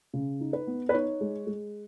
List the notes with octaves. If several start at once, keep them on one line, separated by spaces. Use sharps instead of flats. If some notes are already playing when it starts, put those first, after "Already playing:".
C#3
D#4
B4
B3
B4
D#4 C#5
G#3
G#3